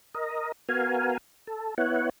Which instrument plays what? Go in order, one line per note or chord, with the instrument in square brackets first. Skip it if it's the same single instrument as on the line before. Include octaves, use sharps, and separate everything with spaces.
[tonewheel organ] A#4 D#5
B3 F#4 A#4 F5 G#5
A4
B3 E4 C#5 F#5